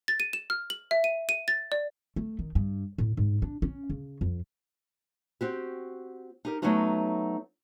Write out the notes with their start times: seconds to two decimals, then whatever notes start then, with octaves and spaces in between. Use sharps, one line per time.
0.08 A6
0.20 D#7
0.33 E7
0.50 F6
0.70 F#7
0.91 E5
1.04 D#7
1.29 D#7
1.48 A6
1.72 D5
2.16 A3
2.39 D#3
2.55 G2
2.98 A2
3.17 G#2
3.42 D4
3.62 C#4
3.90 C#3
4.21 F2
5.41 C4 F#4 G4
6.45 D#4 G4 A#4
6.62 F#3 A3 B3 C#4 D#4 F#4